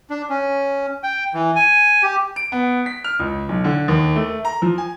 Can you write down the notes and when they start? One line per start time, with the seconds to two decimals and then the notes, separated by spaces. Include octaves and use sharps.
0.10 D4
0.30 C#4
1.03 G5
1.34 E3
1.56 G#5
2.03 G4
2.36 D7
2.52 B3
2.86 B6
3.04 F6
3.19 C#2
3.49 B1
3.64 D3
3.88 D#2
4.16 A3
4.45 A#5
4.62 F3
4.78 G#5